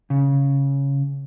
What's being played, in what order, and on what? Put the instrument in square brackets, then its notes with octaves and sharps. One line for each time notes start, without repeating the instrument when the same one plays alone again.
[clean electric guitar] C#3